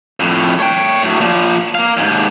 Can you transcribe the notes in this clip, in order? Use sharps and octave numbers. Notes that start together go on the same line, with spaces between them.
F2 A2
C#5 G5
A2 F#3
A#2 F3
A#3 F5
D#2 G#2